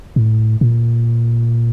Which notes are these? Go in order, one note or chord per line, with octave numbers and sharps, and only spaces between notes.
A2
A#2